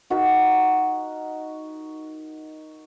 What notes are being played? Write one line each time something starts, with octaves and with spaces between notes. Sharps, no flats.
D#4 F#4 A#4 B5